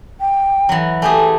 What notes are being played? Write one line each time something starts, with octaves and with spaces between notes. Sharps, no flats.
G5
E3 F#3
A3 G4 G#4 G#5